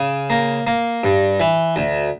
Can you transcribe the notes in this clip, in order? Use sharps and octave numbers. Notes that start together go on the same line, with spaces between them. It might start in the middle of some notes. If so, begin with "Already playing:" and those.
Already playing: C#3
A#3
A#3
G2
E3
D2